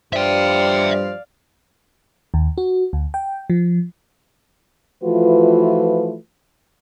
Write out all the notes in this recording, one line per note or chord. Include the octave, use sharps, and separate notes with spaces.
G2 F3 G3 D5 E5 F5 G5
D#2
F#4
D2
G5
F3
E3 F3 A3 F4 F#4 B4